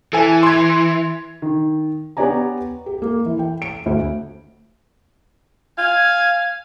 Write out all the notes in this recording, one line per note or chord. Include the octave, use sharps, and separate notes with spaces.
E3 A4 G#5
C6 G#6
D#3
B3 G4 C#5 D5 G#5 A#5
G4
A#3
E3
G5
D7
D2
F5 G#5